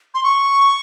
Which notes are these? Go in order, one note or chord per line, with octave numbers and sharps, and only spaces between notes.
C6
C#6